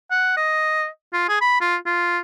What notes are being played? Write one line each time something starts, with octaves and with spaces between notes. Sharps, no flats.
F#5
D#5
F4
G#4
B5
F4
F4